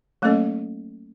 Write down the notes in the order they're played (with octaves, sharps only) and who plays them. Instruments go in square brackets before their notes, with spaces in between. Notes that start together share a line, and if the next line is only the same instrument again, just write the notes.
[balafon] F#3 A3 A#3 C#4 A4 D#5